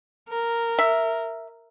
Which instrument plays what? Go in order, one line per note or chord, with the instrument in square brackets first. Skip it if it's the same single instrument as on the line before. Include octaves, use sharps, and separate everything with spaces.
[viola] A#4
[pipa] E5